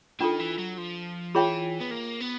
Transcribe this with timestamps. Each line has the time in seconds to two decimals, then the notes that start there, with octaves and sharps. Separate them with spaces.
0.20 D#3 D4 F4 A4
0.40 E3
0.58 F#3
0.78 F3
1.34 E3 F4 G#4 C#5 E5 G5
1.81 B3
1.91 A#3
2.21 B3